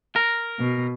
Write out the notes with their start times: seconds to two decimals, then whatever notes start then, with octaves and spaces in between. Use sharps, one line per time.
0.16 A#4
0.59 B2